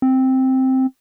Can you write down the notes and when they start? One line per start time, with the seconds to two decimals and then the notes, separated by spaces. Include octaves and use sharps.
0.02 C4